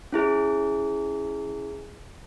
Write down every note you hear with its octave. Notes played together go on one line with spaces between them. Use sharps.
C#4 E4 G#4